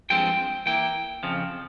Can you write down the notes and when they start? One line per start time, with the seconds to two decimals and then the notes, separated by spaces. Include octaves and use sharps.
0.10 G2 F3 G#3 C4 G5
0.66 E3 A#3 E4 G5
1.23 F2 C#3 F3